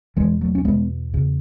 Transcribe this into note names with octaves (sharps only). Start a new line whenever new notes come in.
E2 B2 E3 G#3
F#3 A3
C#4
E2 B2 G#3 B3
E2 C#3